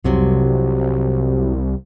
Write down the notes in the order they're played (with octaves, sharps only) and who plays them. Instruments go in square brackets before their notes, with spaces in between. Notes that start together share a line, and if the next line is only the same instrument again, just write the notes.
[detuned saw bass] C2 [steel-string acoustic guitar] F2 C3 F#3